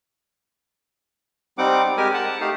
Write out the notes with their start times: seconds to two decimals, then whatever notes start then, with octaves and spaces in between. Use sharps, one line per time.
1.58 G3 C4 D#4 F#5 D6
1.97 G#3 G4 A#4 G#5
2.14 F#5 A5
2.40 A3 D#4 G4 F5